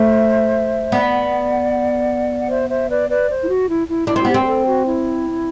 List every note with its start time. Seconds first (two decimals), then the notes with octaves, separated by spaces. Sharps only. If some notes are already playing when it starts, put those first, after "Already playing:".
Already playing: A3 C5 E5
0.92 B3 D5 F#5
2.38 F#5
2.49 C5 E5
2.69 C5 E5
2.89 B4 D5
3.08 B4 D5
3.28 C5
3.41 E4
3.48 F#4
3.68 E4
3.87 E4
4.06 D4 E4
4.16 C4
4.21 F#4
4.25 B3 G4
4.34 C4
4.42 G4
4.46 A4
4.66 F#4
4.86 E4